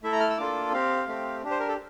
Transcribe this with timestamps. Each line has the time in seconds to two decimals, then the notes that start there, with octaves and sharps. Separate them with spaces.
0.03 A3 E4 A4 E5
0.12 A#5
0.20 F6
0.30 E6
0.38 A#3 D4 F4 A4 D6
0.73 C4 G4 F5
1.07 A3 C4 G4
1.43 D4 G4
1.51 C5
1.60 A#4
1.68 A4